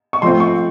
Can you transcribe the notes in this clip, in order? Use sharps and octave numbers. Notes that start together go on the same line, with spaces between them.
C#6
F3 A3 C4 C6
C#6